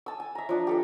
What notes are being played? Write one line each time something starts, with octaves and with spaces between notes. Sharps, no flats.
G#5 A5 E6
G#5
E5 A#5
F3 D4
G4 A4 E5